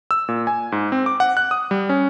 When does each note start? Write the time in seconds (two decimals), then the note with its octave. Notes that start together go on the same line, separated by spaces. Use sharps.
0.11 E6
0.28 A#2
0.47 G#5
0.72 G#2
0.92 C4
1.06 D6
1.20 F#5
1.37 F#6
1.51 D#6
1.71 G3
1.89 C#4